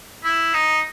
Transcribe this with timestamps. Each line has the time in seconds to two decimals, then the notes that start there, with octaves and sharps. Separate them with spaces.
0.24 E4
0.54 D#4